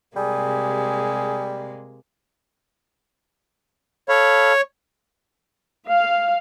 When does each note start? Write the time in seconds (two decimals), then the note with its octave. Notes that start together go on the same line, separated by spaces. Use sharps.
0.16 C3 G3 G#3 A#3 G#4
4.09 A4 C#5 F5 B5
5.88 F5